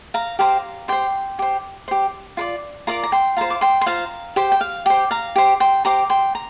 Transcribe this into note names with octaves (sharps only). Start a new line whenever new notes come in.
F5 A#5
G4 C5 F5 A#5
G4 C5 G5 C6
G4 C5
G4 C5
F4 A#4 D5
F4 A#4 D5 A#5 D6
A#5
G5 C6
F4 C5 F5 A#5
D6
G5 C6
C6
F4 C5 F5 A#5
G4 C5 G5
G5
F5
G4 C5 G5
F5 A#5
G4 C5
G5 C6
G4 C5 A#5 D6
G5 C6
A#5